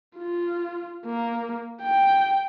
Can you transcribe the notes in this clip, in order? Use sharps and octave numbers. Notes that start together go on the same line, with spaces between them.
F4
A#3
G5